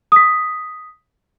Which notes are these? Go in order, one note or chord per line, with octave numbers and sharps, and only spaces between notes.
D#6 B6